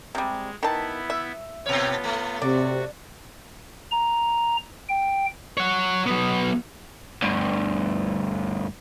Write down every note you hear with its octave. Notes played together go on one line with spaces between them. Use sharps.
C3 G3 G#3
D#3 B3 E4 A5
E5
B2 B3 F4 C#5
A3
C3 F#4 D5
A#5
G5
C#5 F#5
F#3 B3
D2 G2